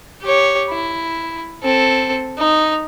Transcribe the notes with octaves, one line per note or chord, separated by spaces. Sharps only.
G4 C#5
E4
C4 A4
D#4